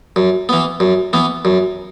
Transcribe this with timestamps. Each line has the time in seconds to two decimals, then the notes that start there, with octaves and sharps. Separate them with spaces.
0.16 F#2
0.49 E3 B3
0.80 F#2
1.13 E3 B3
1.45 F#2